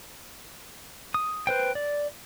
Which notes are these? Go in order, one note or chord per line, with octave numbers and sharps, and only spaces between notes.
D#6
B4 C5 G5
D5